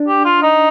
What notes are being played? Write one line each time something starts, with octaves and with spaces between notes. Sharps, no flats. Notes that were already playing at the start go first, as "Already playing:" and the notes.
Already playing: D4
G4
F4
D#4